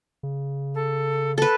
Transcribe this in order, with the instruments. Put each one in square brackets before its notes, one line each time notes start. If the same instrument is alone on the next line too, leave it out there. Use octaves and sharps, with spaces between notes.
[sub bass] C#3
[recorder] A4
[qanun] A4 B4